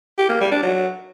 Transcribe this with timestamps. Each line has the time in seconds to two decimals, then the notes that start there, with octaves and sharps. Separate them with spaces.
0.18 G4
0.29 A#3
0.40 G3
0.51 D4
0.62 F#3